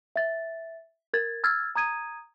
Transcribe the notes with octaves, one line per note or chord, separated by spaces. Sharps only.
E5 A6
A#4 G#6 A6
E6 F6 G#6 A6
A#5 D#6 G#6 D#7